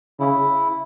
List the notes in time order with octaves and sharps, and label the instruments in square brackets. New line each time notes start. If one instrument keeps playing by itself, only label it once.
[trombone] C#3 [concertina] E4